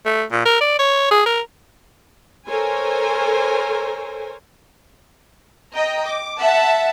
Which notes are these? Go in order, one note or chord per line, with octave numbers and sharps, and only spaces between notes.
A3
A#2
A#4
D5
C#5
G#4
A#4
A4 A#4 C5 C#5 G#5
D#5 G5 A#5
D6
E5 F#5 A5